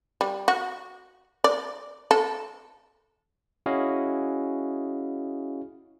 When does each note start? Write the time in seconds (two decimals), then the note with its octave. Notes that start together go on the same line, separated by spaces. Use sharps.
0.21 G3
0.48 F#4
1.44 D5
2.11 A4
3.66 C#4 E4 F#4 G#4 D#5 F5